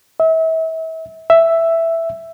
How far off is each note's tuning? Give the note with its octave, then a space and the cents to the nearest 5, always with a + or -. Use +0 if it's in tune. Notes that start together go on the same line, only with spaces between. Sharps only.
E5 -35
E5 +5